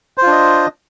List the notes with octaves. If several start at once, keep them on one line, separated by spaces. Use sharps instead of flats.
D4 F4 C5 D#5